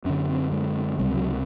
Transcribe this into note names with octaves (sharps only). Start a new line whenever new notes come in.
F#2 D3 C#4
C4
G#3
C#2 C3 G3
F#3